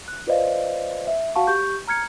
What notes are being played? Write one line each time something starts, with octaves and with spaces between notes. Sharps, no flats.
F#6
F4 B4 C5 D5 D#5 F5
E5
F#4 F5 F#5 A5 C#6
G4 C#6 G6
A#5 F6 G#6 C#7